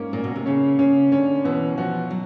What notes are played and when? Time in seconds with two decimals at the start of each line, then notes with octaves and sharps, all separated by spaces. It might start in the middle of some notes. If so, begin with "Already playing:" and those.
Already playing: G#2 A#3 C#4
0.13 A#2 A#3
0.24 B2
0.36 C3
0.46 C#3 C#4
0.79 C#3 C#4
1.12 D3 C#4
1.44 B2 E3
1.78 F3 F#4
2.11 F#3